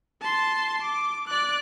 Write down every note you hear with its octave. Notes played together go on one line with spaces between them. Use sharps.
A5 C6
D6
D5 F#6